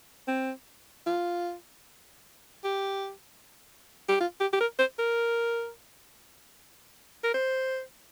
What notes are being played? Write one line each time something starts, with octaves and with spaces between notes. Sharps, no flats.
C4
F4
G4
G4
F4
G4
G4
A#4
C5
A#4
A#4
C5